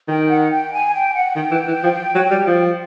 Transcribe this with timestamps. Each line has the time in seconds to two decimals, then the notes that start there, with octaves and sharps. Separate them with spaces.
0.08 D#3 G5
0.30 F#5
0.51 G5
0.72 G#5
0.94 G5
1.14 F#5
1.35 D#3 G5
1.51 E3
1.67 E3
1.83 F3
2.15 F#3
2.31 G3
2.47 F3